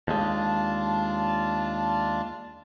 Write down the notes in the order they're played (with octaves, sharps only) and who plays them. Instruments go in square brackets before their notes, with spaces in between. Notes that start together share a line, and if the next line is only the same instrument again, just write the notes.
[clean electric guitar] D#2 G#3 [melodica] D4 F4 A5